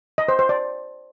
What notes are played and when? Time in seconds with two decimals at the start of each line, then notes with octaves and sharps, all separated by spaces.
0.18 D#5
0.28 C5
0.39 C5
0.49 D5